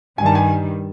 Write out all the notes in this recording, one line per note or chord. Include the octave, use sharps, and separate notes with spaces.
G2 D#3 G3 G#5
A5
G#5